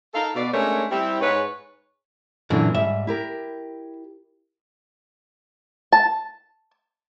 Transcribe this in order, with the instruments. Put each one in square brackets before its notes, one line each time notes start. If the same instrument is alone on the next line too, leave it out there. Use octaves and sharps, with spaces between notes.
[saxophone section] D#4 A4 A#4 F5
B2 D5
G#3 A3 C#4 D4 A#4 C#5
G3 C4 E4
G#2 B4 C#5
[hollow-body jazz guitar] F#2 E3 [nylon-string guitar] A#2 D3
[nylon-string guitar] G#2 G3 [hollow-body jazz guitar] E5
[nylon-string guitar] E4 G4 A#4
[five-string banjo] A5